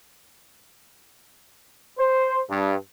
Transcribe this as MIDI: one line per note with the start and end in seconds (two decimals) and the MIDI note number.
1.98 2.39 72
2.49 2.75 43